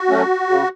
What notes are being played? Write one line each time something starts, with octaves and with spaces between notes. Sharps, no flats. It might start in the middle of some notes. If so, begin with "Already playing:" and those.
Already playing: F#4
F#3 A3 C#4
C#3